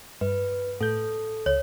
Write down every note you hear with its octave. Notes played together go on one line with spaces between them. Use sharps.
G2 B4
A2 A4 G6
C#2 C#5